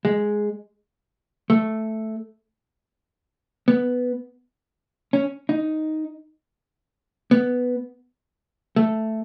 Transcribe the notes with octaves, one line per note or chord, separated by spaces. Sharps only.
G#3
A3
B3
C#4
D#4
B3
A3